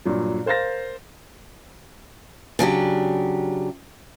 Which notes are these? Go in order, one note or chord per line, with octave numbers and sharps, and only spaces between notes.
G2 A#2 F#3
A#4 C5 F5 A6 A#6
C#3 F#3 D4 G4